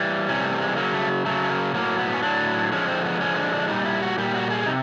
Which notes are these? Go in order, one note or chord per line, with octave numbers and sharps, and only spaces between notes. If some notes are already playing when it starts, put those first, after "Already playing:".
Already playing: E3 G3
C3 E3 G3 C#4
A3
G#3
C#3 F#3 A#3
A3
C#3 F#3 A3
A3
A#3
A2 F#3 A#3
B3
C#4
A2 F#3 D4
D3 F3 G#3 C#4
C4
B3
D3 F3 G#3 C#4
D4
D4
A#2 G3 D#4
E4
F#4
A#2 G3 G4
F#4
G#4
C3 D#4